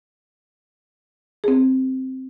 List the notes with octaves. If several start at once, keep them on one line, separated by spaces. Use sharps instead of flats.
C4 G#4